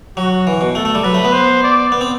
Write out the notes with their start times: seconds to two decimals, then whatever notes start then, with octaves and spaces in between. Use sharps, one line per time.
0.17 F#3 F#4
0.47 E3
0.61 B2
0.75 A3 A4
0.85 A3
0.95 G3
1.04 F#3 B4
1.14 A3
1.25 B3
1.33 C5
1.63 D5
1.92 B3
2.01 C4